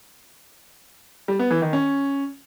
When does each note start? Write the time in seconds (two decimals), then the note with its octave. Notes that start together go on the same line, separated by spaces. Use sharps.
1.28 G3
1.39 B3
1.51 E3
1.62 D#3
1.73 C#4